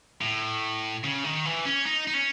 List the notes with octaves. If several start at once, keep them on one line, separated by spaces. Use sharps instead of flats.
A2
C#3
D#3
E3
C#4
D#4
D#4
C#4